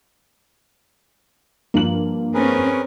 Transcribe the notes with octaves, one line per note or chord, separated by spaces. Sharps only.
G2 F3 A#3 F#7
C4 C#4 G#4 A#4 B4